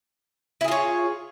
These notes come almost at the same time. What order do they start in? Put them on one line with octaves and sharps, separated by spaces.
E4 G#4 F4 C#5